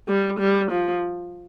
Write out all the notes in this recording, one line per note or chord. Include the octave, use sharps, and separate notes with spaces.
G3
G3
F3